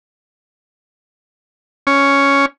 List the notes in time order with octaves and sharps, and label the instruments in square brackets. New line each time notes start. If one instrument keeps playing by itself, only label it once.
[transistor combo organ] C#4